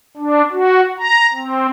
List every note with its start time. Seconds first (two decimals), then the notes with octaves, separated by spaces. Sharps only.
0.17 D4
0.51 F#4
0.98 A#5
1.34 C4